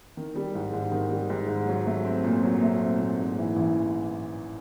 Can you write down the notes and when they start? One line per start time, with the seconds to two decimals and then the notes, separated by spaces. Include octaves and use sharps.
0.17 D#3
0.36 G3
0.55 G#2
0.73 G#2
0.92 D#3
1.11 G3
1.30 G#2
1.48 G#2
1.67 F#3
1.86 A3
2.05 C4
2.24 A#2
2.43 F#3
2.62 A3
2.81 C4
2.99 A#2
3.19 G#2
3.38 E3
3.56 A1